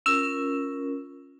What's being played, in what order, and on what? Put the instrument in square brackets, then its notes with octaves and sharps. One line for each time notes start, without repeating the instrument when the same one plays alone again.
[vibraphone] C#4 F4 A#4 [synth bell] E6 E7